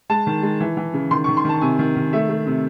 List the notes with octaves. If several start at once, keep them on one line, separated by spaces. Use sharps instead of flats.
G#3 A5
D#3
G#3
E3
E3
C#3
D#3 C6
C#6
D#3
C6
D#3 A5
C3 G#5
D#3
D#3
A3 E5
A3
C3